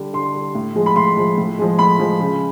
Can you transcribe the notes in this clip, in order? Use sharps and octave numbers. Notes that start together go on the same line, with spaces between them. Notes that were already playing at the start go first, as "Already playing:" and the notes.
Already playing: D3 G3
D3 C6
G3
A2
F3 G#3
B5
A2 C6
F3 G#3
A2
F3 G#3
A2 B5
F3 G#3
C#3